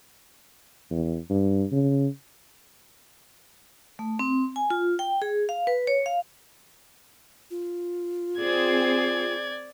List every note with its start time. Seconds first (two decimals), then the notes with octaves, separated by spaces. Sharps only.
0.91 E2
1.30 G2
1.72 C#3
3.99 A3
4.19 C4
4.56 G#5
4.70 F4
4.99 G5
5.22 G#4
5.49 F5
5.67 B4
5.87 C#5
6.06 F5
7.51 F4
8.38 C4 G#4 D5 G#6